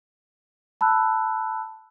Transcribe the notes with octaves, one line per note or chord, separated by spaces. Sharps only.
A5 B5 E6 F#6